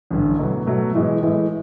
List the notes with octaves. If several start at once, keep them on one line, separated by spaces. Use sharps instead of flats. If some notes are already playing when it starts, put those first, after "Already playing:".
A1 G2 D3
B2 F#3 A3
B2 F#3 A3
A2 E3 G#3
A2 E3 G#3